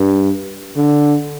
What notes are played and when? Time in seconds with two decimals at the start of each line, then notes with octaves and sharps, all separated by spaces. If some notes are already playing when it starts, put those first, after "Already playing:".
Already playing: G2
0.76 D3